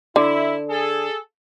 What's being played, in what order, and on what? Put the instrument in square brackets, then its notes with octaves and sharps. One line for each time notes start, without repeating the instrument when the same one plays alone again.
[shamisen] D3 [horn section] E4
[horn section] G#4 A4